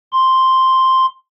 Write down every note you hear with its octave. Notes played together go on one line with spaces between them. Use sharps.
C6